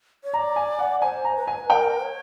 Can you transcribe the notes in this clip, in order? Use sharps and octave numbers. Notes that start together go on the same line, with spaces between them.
C#5
D5 A#5
G#5
F#5
C5 G#5
A#5
B4
G#5
A#4 G5
C#5